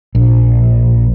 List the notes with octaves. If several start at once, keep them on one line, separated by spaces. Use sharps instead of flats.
A#1